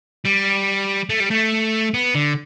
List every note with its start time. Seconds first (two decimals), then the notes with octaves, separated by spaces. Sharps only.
0.25 G3
1.09 A3
1.20 G3
1.30 A3
1.94 B3
2.15 D3